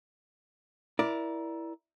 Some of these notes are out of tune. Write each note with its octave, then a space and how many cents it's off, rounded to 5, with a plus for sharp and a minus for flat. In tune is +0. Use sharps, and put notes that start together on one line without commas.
E4 +0 A#4 +25 D5 +0